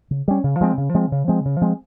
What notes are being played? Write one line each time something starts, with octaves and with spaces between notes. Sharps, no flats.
C#3
G3 C#4
C#3
F3 G#3 C4
C#3
F3 G#3 C4
C#3
F3 G#3 C4
C#3
F3 G#3 C4